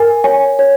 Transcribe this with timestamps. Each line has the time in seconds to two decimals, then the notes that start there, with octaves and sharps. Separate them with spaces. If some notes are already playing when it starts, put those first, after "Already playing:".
Already playing: A#4 G#5
0.24 C#5 G#5
0.59 C#5